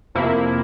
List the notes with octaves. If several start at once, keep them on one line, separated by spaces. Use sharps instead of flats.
F2 C3 F3 A#3 E4